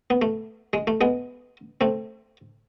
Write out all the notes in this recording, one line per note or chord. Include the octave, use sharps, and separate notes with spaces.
B3
A3
G#3
A3
G#3 B3
A3 C4